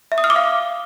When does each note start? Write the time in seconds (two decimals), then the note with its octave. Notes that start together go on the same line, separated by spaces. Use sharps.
0.12 E5
0.18 D#6
0.24 F6
0.30 D6
0.36 F5